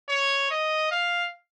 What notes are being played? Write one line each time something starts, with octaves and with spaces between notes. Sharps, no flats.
C#5
D#5
F5